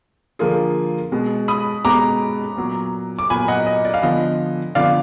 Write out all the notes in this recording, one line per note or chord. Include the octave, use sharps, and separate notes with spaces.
D3 F3 A#3 F4 G#4
B2 G#3 B3
B5 D#6
B2 G#3 B3 A#5 D6
A#2 F#3 B3
D6
A#2 F#3 B3 G#5 B5
D#5 F#5
D#5
D5
F5
D3 F3 B3 D#5
D3 F3 B3 D5 F5